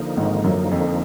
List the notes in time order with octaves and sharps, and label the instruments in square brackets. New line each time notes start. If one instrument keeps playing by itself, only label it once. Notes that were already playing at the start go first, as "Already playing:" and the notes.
Already playing: [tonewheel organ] D3 F3 A#3 D#4
[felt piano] G#1 G#2
F#2
F2